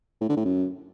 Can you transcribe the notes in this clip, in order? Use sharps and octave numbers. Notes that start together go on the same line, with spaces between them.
A2
D3
A2
F#2